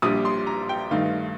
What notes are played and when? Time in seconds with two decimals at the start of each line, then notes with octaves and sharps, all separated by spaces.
0.02 A#1 A#2 G3 D4 D#6
0.25 C6
0.47 A#5
0.69 G5
0.91 G2 D#3 A3 D#4 F5